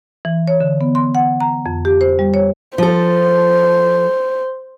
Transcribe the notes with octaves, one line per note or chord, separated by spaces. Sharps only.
E3
C#5
D3
B3
C6
F#5
A#5
F2
G4
C5
G3
C#5
F3 A4 C5